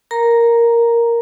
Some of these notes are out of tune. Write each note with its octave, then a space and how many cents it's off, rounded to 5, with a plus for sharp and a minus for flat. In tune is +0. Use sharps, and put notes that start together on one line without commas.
A#4 +0 A#5 +0